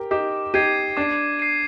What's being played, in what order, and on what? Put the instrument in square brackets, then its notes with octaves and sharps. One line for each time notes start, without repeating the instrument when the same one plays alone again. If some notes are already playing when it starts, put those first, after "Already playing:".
Already playing: [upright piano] G4 A#4
[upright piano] D#4 G4 [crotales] D6
[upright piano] D#4 G4 [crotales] G#6 C7 D#7
[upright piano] D4 [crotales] D6
[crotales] G#6 C7 D#7